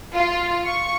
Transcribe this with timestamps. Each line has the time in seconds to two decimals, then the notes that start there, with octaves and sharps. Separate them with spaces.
0.14 F4
0.65 C#6